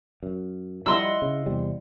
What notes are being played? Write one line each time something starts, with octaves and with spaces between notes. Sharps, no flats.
F#2
F3 G3 E4 D#5 F#5 C6 E6
C#3
E2 C3 G3